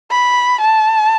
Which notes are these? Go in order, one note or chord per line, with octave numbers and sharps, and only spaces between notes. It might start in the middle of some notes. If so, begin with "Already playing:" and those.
B5
A5